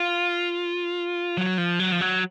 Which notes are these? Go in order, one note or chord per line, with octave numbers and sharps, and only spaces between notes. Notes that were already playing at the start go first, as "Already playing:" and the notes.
Already playing: F4
F#3
F3
F#3
F3
F#3